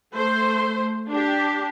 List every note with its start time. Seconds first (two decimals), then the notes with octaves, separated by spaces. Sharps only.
0.13 A3 C5
1.09 D4 G4